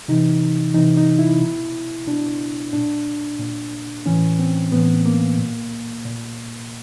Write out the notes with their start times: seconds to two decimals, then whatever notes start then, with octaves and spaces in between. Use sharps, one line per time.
0.08 C3 E3 D#4
0.74 C3 E3 D#4
0.97 D#4
1.19 E4
1.40 B2
2.07 B2 D4
2.73 A#2 D4
3.39 A#2
4.06 A2 E3 C#4
4.39 C4
4.72 A2 E3 B3
5.06 A#3
5.38 A#2
6.05 A#2